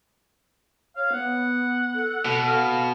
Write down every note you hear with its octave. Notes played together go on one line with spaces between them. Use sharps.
C#5 F5
B3 F#5
A4
B2
F5